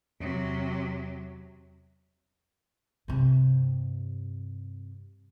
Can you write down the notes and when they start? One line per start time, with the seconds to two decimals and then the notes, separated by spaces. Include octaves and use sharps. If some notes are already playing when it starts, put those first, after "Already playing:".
0.20 E2 C3 F#3
3.08 G2 C3